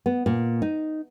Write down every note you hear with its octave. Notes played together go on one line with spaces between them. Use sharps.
B3
A#2
D#4